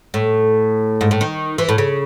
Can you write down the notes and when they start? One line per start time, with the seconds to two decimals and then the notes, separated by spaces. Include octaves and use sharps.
0.14 A2
1.01 G#2
1.11 A2
1.21 D#3
1.58 E3
1.69 A2
1.78 C#3